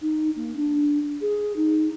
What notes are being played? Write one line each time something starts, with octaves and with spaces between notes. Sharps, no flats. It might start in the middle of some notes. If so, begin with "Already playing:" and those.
D#4
A#3
D4
G#4
D#4